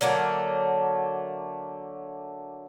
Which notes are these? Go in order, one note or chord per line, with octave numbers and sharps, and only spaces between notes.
D3 F#3 A3 A#3